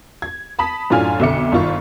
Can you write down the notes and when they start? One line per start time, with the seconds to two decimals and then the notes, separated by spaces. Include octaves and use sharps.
0.22 G#6
0.59 A5 B5 D#6 B6
0.90 F#2 A2 D4 F4 G#5 F6
1.20 B1 F2 D3 E5 D6 C#7
1.52 G1 D#3 F4 C#6